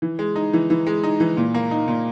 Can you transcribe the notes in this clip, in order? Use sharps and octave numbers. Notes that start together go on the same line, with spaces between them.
E3
G#3
D#4
E3
E3
G#3
D#4
E3
A#2
A#3
D#4
A#2